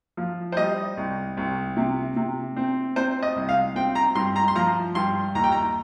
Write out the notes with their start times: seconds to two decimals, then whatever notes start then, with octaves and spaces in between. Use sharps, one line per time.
0.17 F3
0.52 C5
0.57 G3 D#5
0.97 C2
1.37 C2
1.77 C3
2.16 C3
2.56 C4
2.96 C4 C5
3.22 D#5
3.36 C2
3.49 F5
3.75 C4 G5
3.95 A#5
4.15 G2 C6
4.36 A#5
4.48 C6
4.55 F3 A#5
4.95 G2 C6
5.35 D#2 A#5
5.44 G5
5.52 A#5